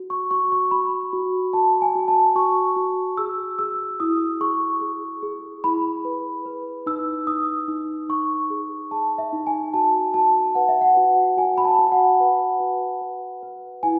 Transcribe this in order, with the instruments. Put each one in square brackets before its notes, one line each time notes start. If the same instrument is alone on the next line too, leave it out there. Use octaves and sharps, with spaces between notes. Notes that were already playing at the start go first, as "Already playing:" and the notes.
Already playing: [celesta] F#4
C#6
F#4 C#6
C#6
F#4 B5
F#4
F#4 A5
G#5
F#4
A5
F#4 C#6
F#4
G#4 E6
G#4 E6
E4 D#6
G#4 C#6
G#4
G#4
E4 B5
B4
B4
D#4 E6
D#4 D#6
D#4
D#4 C#6
G#4
G#4 A5
E5
D#4
G#5
F#4 A5
F#4 A5
B4 F#5
E5
F#5
F#4
F#4 G#5
B5
A5
F#4
F#5
B4
F#4
B4
B4
E4 G#5